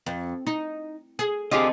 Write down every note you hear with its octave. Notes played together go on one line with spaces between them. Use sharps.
F2
D#4
G#4
D3 C4 F4 G4 G#4 D#5